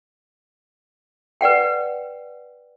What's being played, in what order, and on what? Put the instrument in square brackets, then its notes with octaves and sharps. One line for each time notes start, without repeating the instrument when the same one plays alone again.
[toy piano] B4 D5 F#5 G5